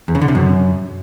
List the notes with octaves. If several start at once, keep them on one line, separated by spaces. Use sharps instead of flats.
E2
C#3
D3
C3
F#2